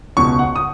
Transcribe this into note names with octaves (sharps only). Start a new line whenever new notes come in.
C#2 B2 C#6
F#5
D#6